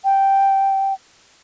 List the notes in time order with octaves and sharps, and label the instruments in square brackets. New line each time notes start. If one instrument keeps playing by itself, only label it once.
[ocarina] G5